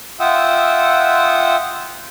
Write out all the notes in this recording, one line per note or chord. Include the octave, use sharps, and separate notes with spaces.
F4 E5 F#5 G5 D#6 E6